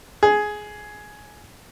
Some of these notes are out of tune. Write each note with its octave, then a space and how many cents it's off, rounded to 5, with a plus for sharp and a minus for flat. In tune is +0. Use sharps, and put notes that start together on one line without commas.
G#4 +10